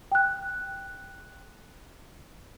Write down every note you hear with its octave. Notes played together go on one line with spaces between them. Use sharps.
G5 F#6